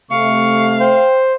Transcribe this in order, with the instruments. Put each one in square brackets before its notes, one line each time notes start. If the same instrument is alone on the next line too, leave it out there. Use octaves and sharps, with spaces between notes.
[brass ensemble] C3 A3 [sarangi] F5 [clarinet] C#6
[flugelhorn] C5 [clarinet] G5